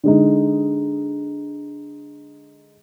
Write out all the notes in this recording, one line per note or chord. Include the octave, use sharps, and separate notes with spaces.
D3 G#3 D#4